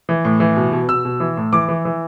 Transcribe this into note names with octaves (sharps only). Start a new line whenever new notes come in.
E3
A2
E3
B2
B2
B2 E6
B2
E3
A2
E3 D6
E3
E3